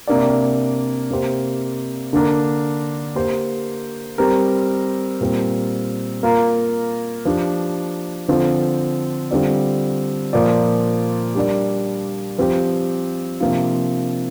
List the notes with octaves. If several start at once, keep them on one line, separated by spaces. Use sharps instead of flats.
C3 A#3 D4 A#4 D5
C3 A#3 G4 C5
D3 A#3 D4 A#4
A#3 G4 C5
G3 C4 G4 A#4
A#2 G3 C4 A#4
A#3 F4 A#4
F3 D4 G4
D3 F3 C4 F4
D3 G3 C4 F4 D5
A#2 F3 A#3 F4 D5
G3 D4 A#4 D5
F3 C4 G4
C3 F3 A#3 D4 F4